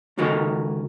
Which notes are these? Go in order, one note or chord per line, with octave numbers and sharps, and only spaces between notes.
C#2 D#3 F#4 A4 A#4 D#5